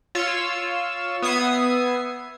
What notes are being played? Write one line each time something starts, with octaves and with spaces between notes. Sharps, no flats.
F4 C#5 E6
B3 E5 D#6 G#6 C7